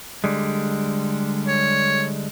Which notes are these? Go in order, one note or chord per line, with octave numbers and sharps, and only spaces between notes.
D3 G3 G#3
C#5